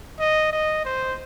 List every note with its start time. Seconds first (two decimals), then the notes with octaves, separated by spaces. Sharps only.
0.20 D#5
0.52 D#5
0.85 C5